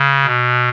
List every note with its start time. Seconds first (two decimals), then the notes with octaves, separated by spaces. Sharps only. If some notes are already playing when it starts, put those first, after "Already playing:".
Already playing: C#3
0.24 B2